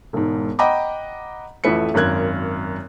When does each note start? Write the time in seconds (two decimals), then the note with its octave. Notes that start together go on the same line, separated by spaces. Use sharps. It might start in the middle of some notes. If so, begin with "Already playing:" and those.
0.13 E1 G#2
0.59 D#5 F#5 G5 A#5 B5 D6
1.64 A1 F2 A3 B4 E5 C#7
1.94 G#1 F#2 A#4 F#6 G#6